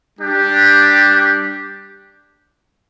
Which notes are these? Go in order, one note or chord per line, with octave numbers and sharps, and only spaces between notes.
G3 D4 G4